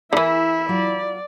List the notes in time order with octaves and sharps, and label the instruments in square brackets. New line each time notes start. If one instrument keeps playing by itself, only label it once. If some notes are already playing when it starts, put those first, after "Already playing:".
[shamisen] D3 E3 [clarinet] E4 [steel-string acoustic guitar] G#4 A#4 [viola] E5
[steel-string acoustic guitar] F#3 F4 [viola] D5